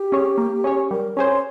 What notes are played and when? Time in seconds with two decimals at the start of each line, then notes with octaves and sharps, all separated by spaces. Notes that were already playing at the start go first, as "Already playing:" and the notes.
Already playing: G4
0.12 C#4 G#4 C#5
0.38 A#3
0.64 C#4 G#4 C#5
0.91 G3 A#4
1.16 C#4 G#4 C5 C#5